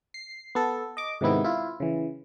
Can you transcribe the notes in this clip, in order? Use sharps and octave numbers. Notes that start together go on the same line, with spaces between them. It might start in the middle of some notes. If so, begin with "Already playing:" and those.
C7
B3 A4
D#5 D6
G#2 C3 D#3 B3 E4
E4 F4
C#3 E3